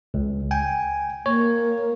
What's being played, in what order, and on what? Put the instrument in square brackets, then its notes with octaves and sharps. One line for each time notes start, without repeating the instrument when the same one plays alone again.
[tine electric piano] C#2
G5 G#5
[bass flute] A#3 [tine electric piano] C#5